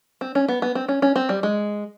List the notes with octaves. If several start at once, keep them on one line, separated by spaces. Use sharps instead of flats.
C4
C#4
B3
B3
C4
C#4
C#4
C4
G3
G#3